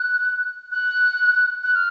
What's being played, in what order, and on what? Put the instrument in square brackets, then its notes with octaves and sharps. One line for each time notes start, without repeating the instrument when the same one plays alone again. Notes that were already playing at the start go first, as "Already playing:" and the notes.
Already playing: [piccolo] F#6
F#6
F#6
F6